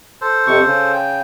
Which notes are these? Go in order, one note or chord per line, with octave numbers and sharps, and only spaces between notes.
A4 C5
F2 C3 C#6
C#3
G5